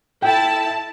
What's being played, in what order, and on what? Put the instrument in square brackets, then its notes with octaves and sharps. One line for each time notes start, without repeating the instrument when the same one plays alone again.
[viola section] E4 A4 A5 [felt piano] G5